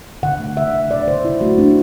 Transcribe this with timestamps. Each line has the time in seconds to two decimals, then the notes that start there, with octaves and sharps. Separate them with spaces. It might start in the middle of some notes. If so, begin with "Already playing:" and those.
0.23 D3 F#5
0.39 A3
0.57 D3 E5
0.74 D3
0.90 D3 D5
1.07 D3 C5
1.24 D3 E4
1.41 A3 F#4
1.58 A3 D4